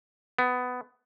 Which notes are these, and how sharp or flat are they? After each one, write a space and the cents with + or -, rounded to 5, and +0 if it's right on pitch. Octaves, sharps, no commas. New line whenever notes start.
B3 +15